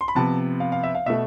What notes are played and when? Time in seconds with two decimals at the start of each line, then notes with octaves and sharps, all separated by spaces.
0.01 C6
0.08 B5
0.15 C3 F3 B3 A5
0.60 F5
0.72 F5
0.83 E5
0.95 F5
1.06 B2 A3 E5